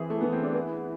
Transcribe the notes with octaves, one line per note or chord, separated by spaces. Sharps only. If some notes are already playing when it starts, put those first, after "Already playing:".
Already playing: E3 C4 E4 G#4
A3
E3 B3
C4
D4
B3 E4